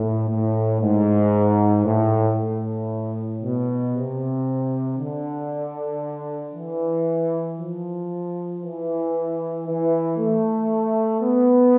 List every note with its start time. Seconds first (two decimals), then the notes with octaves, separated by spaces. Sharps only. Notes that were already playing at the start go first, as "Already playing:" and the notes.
Already playing: A2
0.29 A2
0.82 G#2
1.86 A2
2.38 A2
3.42 B2
3.94 C3
4.98 D3
6.55 E3
7.58 F3
8.62 E3
9.67 E3
10.18 A3
11.22 B3